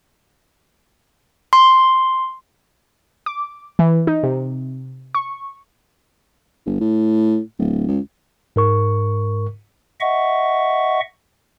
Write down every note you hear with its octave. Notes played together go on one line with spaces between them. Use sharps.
C6
D6
E3
D#4
C3
C#6
G1
A2
D1
C#2
G#2 A#4 C#6
D#5 E5 F#5 C#6